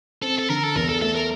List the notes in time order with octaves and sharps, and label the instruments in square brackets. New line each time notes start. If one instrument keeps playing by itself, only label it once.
[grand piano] C4 [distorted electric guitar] A4
[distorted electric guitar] A4
[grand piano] D3 [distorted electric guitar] A#4
[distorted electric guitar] A4
[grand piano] E2 [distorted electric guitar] A#4
[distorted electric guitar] A4
[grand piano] A3 [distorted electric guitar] A4
[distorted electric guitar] A#4